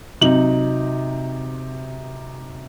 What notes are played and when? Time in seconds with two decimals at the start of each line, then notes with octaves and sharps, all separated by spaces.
0.21 C3 F#3 D#4 F#7